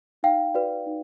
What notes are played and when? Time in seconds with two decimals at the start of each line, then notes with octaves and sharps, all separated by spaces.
0.23 D#4 F5 G5
0.54 F#4 B4 D5
0.86 D#4